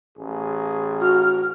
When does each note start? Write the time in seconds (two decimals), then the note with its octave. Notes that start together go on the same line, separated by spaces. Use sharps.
0.18 A1 G#4
1.01 F#4 F6